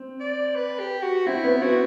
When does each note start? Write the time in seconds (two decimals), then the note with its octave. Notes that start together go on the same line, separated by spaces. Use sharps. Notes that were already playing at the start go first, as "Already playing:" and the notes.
Already playing: C4
0.20 D5
0.56 B4
0.79 G4
1.03 F#4
1.26 C4 E4
1.44 B3
1.62 C4 F#4